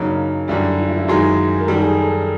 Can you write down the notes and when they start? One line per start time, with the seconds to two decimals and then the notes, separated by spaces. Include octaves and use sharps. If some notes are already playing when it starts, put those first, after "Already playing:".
Already playing: F#2 C#3 F#3 A#3 D4 D#4
0.48 F#2 D3 G3 E4
0.78 E4
0.88 F4
0.97 E4
1.08 F#2 D#3 G#3 F#4
1.60 A#4
1.67 F#2 D#3 G3 A4
1.83 G#4
1.97 A4
2.13 A4